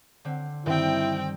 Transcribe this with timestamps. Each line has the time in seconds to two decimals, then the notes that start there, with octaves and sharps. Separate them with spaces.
0.25 D3 C4
0.66 G2 D#3 C4 E4 G5